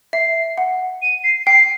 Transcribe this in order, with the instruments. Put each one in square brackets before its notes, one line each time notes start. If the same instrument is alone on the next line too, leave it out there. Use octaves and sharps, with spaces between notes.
[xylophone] E5 [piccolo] C7
[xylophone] F#5
[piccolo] D#7
C7
[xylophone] G5 [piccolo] C7